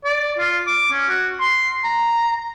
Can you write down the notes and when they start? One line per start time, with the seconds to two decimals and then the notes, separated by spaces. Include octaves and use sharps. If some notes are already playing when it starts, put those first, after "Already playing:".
0.04 D5
0.39 F4
0.67 D6
0.91 C#4
1.09 F#4
1.41 C6
1.84 A#5